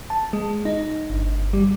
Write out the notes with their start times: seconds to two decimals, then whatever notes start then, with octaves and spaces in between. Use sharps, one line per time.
0.10 A5
0.33 G#3
0.65 D#4
1.10 G1
1.53 G3